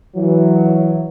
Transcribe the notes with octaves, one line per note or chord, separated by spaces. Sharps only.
E3 F#3